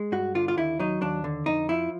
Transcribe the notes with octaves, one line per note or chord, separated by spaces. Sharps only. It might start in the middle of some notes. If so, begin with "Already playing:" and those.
Already playing: G#3
G2 F#4
D3 F4
F4
D#2 E4
F#3 D#4
D#2 D4
D3
F2 D#4
F3 E4